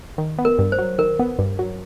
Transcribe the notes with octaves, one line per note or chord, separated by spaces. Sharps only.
D#3
B3
A#4
G2
C5
F#3
D#3 A#4
B3
G2
F#3